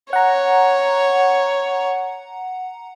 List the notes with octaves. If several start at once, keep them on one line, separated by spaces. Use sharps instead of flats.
C#5 F#5 A#5